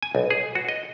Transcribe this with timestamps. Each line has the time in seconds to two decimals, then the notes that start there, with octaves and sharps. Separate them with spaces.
0.03 G#5
0.15 B1
0.31 G#4
0.55 F#4
0.69 D#5